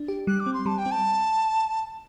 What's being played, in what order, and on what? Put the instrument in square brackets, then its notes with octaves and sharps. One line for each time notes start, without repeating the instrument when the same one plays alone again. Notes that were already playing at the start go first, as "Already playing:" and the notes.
Already playing: [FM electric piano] D4
G4
[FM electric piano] G3 [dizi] F#6
[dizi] D6
[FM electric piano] C4
[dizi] C6
[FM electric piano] G3 [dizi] A5
[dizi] G5
[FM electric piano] C4
[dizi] A5